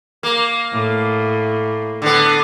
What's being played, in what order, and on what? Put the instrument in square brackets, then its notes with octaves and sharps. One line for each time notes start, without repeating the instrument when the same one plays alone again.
[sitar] A#3
[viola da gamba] A2
[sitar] D3 B3